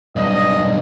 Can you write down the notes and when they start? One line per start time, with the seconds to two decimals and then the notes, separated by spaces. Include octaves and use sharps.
0.16 B1 G2 D#5